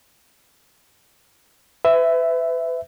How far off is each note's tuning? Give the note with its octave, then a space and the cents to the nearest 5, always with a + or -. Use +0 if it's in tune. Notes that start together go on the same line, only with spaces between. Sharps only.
B4 +35 E5 +0